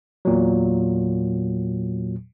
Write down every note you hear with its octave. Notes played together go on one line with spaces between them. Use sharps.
E2 A#2 F#3